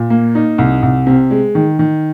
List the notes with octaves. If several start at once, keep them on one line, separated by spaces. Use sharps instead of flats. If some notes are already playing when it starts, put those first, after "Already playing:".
Already playing: A#2
A#3
D#4
C2
C2
C3
G#3
D#3
D#3